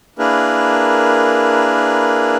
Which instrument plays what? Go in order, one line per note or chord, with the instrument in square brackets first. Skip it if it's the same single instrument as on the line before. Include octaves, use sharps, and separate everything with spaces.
[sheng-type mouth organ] A#3 D4 E4 G#4 A#4 B4